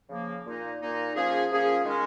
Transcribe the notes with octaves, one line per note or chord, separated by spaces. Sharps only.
C#3 F3 A#3
A#2 A#3 D#4
A#2 A#3 D#4
F3 A#3 C#4 G#4
F3 A#3 C#4 G#4
D#3 G#3 C#4